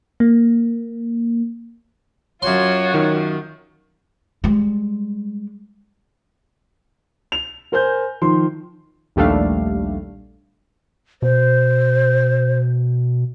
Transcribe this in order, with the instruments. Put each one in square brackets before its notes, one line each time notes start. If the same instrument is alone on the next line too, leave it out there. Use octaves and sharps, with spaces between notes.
[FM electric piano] A#3
[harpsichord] F#2 C6 [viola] F4 F#4 [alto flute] C#5
[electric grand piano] D#3
[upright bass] G3 G#3
[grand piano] F7
A#4 C5 G#5 G6
D#3 F3 C6
[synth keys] A#1 D#2 G3 A3 D4 F5
[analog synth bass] B2 [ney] C5